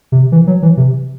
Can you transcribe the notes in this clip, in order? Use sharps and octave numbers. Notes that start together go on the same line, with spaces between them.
C3
E3
F#3
E3
C3